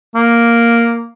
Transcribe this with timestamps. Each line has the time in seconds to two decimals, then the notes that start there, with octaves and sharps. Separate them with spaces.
0.15 A#3